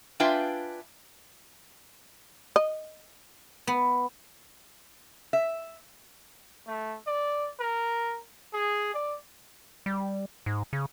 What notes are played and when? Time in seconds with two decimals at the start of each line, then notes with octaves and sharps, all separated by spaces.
0.20 D4 F4 B4 E5 G5 G#5
2.56 D#5
3.67 B3
5.33 E5
6.67 A3
7.06 D5
7.60 A#4
8.53 G#4
8.94 D5
9.86 G3
10.46 G#2
10.73 C#3